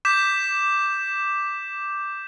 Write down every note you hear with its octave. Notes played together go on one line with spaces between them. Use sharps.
D6 G6 B6 E7